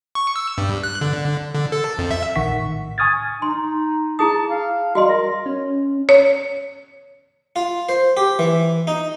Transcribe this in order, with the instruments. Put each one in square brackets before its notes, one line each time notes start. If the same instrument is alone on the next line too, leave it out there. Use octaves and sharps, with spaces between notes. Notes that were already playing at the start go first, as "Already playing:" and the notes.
[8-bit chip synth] C#6
E6
G2
F#6
D3
D3
A4
F2
E5
[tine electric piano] A#1 D#3 F#5 C#6 B6
A2
G#5 C#6 D#6 F6 G#6 A6
[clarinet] D#4 [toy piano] C6
[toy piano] E4 G#4 D#6 [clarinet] A5
[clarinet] F5
[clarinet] G3 [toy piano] F#4 D#5 C6
[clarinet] A#4
[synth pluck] C#4
[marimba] C#5
[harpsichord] F4
C5
G4
E3
D#4